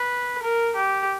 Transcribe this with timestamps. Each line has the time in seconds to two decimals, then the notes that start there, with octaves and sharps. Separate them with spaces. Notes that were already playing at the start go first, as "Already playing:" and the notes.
Already playing: B4
0.43 A#4
0.76 G4